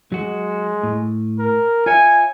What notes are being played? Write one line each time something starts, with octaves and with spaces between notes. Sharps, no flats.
F#3 G#3 F#4
A2
A#4
F4 C#5 E5 G#5